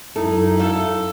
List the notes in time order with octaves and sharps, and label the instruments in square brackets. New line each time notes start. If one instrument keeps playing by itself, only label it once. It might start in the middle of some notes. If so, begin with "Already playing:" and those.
[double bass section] F#2 [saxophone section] D#4 E4 [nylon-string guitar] A4
[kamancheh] A4 [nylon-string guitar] F5